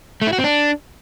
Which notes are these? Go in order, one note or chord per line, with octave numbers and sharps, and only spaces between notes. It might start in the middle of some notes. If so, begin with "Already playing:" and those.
A3
E4
F#4
C4
D4